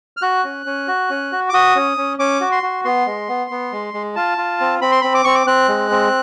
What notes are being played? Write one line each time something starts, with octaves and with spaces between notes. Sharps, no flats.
F6
F#4 F#6
C#4
C#4
F#4
C#4
F#4
D6
F#4 D#6
C#4
C#4
C#4 D6
F#4
C6
F#4
B3 C6
G#3
B3
B3
G#3
G#3
F4 A5
F4
C4
C4 B5
C6
C4 B5
D6
C4 C#6
D6
C4 F#6
G#3
C4